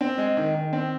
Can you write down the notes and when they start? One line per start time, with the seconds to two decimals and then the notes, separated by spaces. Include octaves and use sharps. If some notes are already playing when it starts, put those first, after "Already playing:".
0.01 C4
0.18 G#3
0.37 D#3
0.54 D#3
0.73 C4